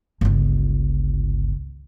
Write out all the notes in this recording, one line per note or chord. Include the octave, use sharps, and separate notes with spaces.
G1 C#2